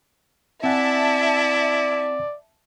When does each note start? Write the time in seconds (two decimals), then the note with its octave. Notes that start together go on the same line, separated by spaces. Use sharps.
0.64 C4 E4 D5 E5 F#5 G#5 A5